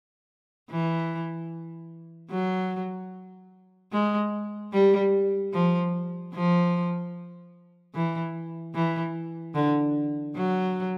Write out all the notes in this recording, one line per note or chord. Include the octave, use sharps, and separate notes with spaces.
E3
F#3
G#3
G3
F3
F3
E3
E3
D3
F#3